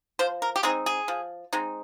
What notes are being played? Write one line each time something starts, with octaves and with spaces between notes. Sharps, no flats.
F3 C5
A#4
G4
G#3 C4 D#4 G#4
G#4
F3
G#3 C4 D#4